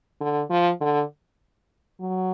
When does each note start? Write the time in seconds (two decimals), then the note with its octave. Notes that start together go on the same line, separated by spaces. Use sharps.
0.21 D3
0.50 F3
0.81 D3
2.01 F#3